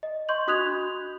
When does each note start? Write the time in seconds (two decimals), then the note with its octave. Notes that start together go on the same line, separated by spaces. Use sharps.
0.03 D#5
0.29 D#5 C6 C#6 G6 F#7
0.47 D4 F#4 D#6 F#6 G#6 F7